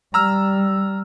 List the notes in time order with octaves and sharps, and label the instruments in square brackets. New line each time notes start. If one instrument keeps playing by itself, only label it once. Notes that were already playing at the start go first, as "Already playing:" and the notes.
[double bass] G3 [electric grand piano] A#5 E6 F6